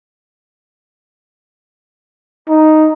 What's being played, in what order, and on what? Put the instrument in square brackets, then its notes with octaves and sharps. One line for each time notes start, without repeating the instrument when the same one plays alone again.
[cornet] D#4